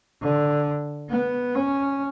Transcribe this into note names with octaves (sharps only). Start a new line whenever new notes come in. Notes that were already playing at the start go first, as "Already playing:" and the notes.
D3
B3
C#4